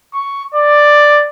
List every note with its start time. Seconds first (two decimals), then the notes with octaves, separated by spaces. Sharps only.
0.14 C#6
0.55 D5